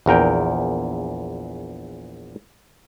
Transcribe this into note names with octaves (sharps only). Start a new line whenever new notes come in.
A#1 E2 A#4 G5